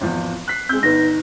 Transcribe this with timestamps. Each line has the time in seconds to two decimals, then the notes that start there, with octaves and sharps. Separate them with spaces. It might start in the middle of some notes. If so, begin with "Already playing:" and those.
0.01 G#1 E2 F3
0.48 F#6 B6 C7
0.69 G#3 C4 E6 G6
0.83 G1 D#4 B4 A#6